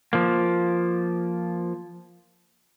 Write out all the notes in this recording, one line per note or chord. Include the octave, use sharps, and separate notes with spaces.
F3 A#3